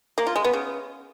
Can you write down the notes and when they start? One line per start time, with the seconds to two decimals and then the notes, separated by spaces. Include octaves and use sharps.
0.18 A#3
0.27 F4
0.36 G#3
0.44 B3
0.53 C#3